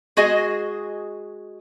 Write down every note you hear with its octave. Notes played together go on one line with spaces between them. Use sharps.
G#3 F#4 G#4 D#5